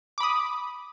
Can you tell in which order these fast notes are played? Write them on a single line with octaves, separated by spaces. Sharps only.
D6 B5 D#6